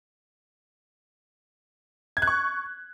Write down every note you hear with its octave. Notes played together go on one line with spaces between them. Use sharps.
G#6
F#6
C#6